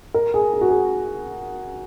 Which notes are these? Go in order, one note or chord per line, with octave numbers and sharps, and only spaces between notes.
A#4
G#4
G#4
F#4
G#4